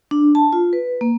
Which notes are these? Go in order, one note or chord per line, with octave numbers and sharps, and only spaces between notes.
D4
A5
F4
B4
A#3